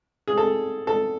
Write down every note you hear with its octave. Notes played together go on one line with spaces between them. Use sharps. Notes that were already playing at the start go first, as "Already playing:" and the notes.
G#4
A4
A4